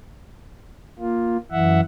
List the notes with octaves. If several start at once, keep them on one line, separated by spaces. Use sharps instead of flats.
A#3 F4
F#2 E3 E5 F#5